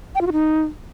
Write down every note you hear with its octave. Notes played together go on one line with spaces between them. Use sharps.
G5
F4
F#4
D#4